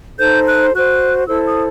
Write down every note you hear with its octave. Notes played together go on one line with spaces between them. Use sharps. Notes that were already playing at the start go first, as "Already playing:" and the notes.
D#4 A4 C5 G6
F#6
F#4 C5 F#6
E4 A4 C5 E6
D#6